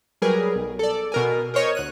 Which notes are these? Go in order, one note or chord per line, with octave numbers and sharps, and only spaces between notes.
F#3 G3 G#4 A#4 B4
B1
A4 D5
B2 A#4 G#5
A#4 C5 C#5 D#5
D2 F#6 D#7